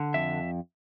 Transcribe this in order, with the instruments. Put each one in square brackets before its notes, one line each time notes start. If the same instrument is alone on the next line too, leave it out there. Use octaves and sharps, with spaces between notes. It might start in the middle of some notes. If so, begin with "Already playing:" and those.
Already playing: [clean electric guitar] D3
F2 E5